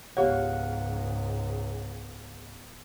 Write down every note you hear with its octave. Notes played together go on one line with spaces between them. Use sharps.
C#2 G#2 B3 G4 C#5 F5 F#5